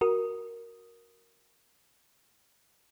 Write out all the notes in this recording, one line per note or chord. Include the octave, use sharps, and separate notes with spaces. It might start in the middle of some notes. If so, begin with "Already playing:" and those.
F#4 A#4 D#6